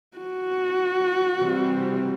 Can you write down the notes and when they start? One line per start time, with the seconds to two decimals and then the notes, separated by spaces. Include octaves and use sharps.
0.17 F#4
1.40 C3 E3 G3 C4